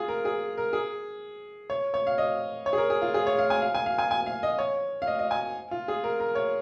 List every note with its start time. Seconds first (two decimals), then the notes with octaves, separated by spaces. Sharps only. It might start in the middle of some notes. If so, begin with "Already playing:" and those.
Already playing: F4 G#4
0.08 A#4
0.25 G#4
0.58 A#4
0.73 G#4
1.70 C#5
1.94 C#5
2.07 F5
2.18 D#5
2.66 C#5
2.73 G#4
2.78 A#4
2.90 G#4
3.02 F4
3.14 G#4
3.27 C#5
3.38 F5
3.50 G#5
3.62 F5
3.74 G#5
3.86 F5
3.98 G#5
4.11 G#5
4.26 F5
4.43 D#5
4.59 C#5
5.02 F5
5.07 D#5
5.19 D#5
5.31 G#5
5.71 F4
5.88 G#4
6.04 A#4
6.20 A#4
6.35 C#5